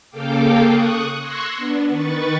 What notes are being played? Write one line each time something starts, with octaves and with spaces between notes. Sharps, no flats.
C#3 A#3 A4 F5 G5 D6
C#6 D#6 F#6
C6 C#6 E6 F#6 G#6 A#6
B3 D4
D#3 B4 C#6 A6